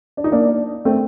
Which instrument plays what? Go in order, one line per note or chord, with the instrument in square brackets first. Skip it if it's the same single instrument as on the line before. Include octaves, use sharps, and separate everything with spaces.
[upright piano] D4
D#4
A#3 D4
A3 C4